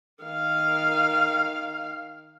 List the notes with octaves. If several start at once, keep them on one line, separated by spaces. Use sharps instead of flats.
D#3 F5